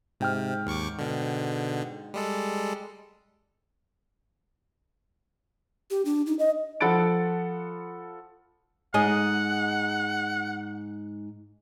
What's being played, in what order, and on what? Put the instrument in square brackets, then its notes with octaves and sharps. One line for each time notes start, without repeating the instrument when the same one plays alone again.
[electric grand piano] G#2 G5 F6 [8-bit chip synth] C3
[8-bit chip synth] D#2 C#6 D6
B2 D3
G3 G#3 A4
[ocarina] G4
D4
D#4
D#5
[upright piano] F3 A4 F#5 B5 A6 D7
[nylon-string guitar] G#2 G#4 D#5 [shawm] F#5